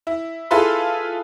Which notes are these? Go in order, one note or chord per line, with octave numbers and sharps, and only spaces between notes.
E4
E4 F4 G#4 A4 B4 C6